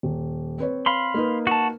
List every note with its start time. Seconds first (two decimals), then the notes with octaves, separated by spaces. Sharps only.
0.03 D#1
0.58 C4 B4 C#5
0.86 F5 B5 C6
1.14 A#3 D#4 B4
1.47 F#4 A5